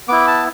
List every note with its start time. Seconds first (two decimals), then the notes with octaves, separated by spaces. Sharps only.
0.08 B3 E4 D6
0.27 A5